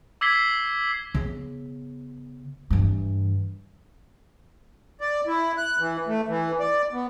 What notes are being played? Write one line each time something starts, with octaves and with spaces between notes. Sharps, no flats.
D6 E6 G#6 B6 C7 G7
C#3 B3
G2 E3
D5
E4
F#6
E3
A3
E3
D5
B3